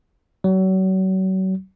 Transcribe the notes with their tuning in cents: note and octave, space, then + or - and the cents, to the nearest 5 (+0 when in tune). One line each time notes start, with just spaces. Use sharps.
F#3 +35